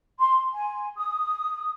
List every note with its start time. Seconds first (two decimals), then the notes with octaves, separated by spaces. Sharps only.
0.19 C6
0.54 G#5
0.96 D#6